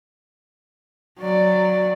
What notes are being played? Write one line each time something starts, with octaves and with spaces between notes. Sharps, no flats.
F#3 D5